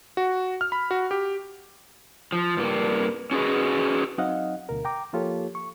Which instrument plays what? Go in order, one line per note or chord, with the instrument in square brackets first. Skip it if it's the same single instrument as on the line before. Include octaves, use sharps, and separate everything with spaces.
[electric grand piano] F#4
F6
B5
F#4
G4
[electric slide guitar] F3
G2 A#3
C#4 F#4 G#4 B4 D#5
[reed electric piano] F#3 C4 D#4 D#5 F5 F#5
D2 B2 A#4
G5 A#5 D6
F3 A#3 F4 G4 A4 C#5
C#6